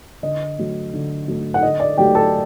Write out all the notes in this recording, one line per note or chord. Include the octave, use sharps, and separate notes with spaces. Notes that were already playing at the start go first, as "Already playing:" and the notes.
D3 D#5
F#3 A3
D3
F#3 A3
F#5
D3 D#5
D5
F#3 A3 G4 G5
A4 A5